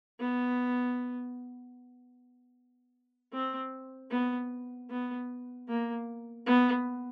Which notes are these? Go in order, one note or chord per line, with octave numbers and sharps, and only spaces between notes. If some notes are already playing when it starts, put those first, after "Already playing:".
B3
C4
B3
B3
A#3
B3